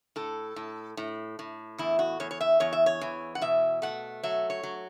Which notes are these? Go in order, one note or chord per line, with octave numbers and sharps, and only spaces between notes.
A2 A4
A2
A2
A2
E2 E4
F#4
E2 C#5
C#5
E5
E2 C#5
E5
C#5
E3
F#5
B2 E5
A3 F#5
F#3 E5
C#5
F#3